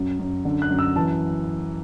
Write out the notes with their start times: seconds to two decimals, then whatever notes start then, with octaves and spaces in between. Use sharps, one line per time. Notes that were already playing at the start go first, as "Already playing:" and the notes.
Already playing: F#2
0.19 F#2
0.45 D3
0.62 F#6
0.70 F#2
0.79 E6
0.96 E3 A5